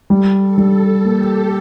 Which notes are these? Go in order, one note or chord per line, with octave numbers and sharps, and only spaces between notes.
G3 A4
A4
G3
A4
A#3 G4